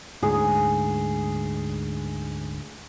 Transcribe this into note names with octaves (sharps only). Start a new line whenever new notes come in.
D2 G#2 G#4